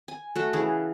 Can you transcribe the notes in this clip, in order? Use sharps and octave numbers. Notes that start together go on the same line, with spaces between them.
G#5
A3 F#4
C#3 E3 G#4